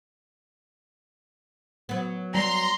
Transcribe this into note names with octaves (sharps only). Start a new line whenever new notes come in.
F#3 B3
G3 A#5 C6